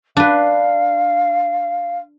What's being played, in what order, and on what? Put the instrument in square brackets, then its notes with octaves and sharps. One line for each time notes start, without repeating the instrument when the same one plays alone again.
[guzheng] D4 B4 [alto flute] F5